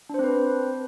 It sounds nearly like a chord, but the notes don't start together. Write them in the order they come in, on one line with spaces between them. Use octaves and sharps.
D4 C5 C4 B4